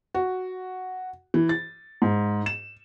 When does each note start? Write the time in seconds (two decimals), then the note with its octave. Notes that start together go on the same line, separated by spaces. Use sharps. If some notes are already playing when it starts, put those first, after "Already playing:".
0.14 F#4
1.34 E3
1.49 A6
2.02 G#2
2.46 E7